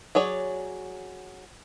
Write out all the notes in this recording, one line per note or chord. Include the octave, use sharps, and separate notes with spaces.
F#3 G#4 C#5 D5